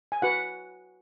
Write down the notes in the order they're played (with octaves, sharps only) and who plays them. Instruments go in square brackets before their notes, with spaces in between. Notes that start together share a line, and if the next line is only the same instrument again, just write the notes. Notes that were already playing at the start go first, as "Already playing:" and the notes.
[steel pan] G#5
F#4 B4 F#5